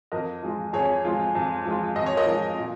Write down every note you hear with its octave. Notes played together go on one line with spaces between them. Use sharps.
F2 A#4 D#5
F3 G#3 F4
F2 G#4 C#5
F3 G#3 F4
F2
F3 G#3 F4
F2 D#5
C#5
A#4 D#5
F3 G#3 F4
A#2